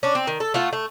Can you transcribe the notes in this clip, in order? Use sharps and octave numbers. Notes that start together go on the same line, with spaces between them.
C#4 D4
C4
D#3
A4
A3 F4 F#5
A3